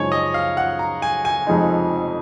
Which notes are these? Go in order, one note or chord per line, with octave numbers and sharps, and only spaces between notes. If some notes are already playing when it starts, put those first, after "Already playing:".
Already playing: F#2 C#3 F3 G#3 D#4 C#5 G#5
D#5
F5
F#5
A#5
G#5
G#5
F1 F2 F3 G#3 D#4